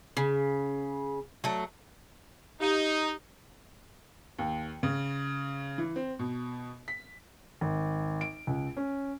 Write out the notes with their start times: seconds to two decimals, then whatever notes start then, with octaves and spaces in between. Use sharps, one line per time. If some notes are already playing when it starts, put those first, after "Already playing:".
0.17 C#3
1.44 F#3 A3
2.60 D#4 G4 F5
4.39 D#2
4.83 C#3
5.78 E3
5.96 C4
6.19 B2
6.88 B6
7.61 G#1
8.21 D7
8.47 C#2
8.77 C#4